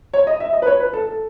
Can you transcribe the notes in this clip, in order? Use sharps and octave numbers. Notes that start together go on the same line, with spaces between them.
C#5
D#5
E5
D#5
B4
C#5
B4
A4
A4